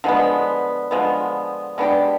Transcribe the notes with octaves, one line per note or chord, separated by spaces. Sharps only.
D3 F3 G#3 B3
D3 F3 G#3 B3
G#3 B3 D4 G4